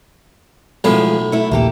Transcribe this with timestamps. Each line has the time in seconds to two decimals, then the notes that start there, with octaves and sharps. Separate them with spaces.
0.84 B1 A2 F3 G#3 B3
1.32 A3 E4
1.51 A#1 D#2 A#3 G4 A4